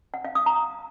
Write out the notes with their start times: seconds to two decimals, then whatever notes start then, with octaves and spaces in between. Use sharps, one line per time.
0.14 F#5
0.25 F5
0.35 D#6
0.46 A#5